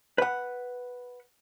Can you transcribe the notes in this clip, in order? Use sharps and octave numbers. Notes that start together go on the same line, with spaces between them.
B4 F#5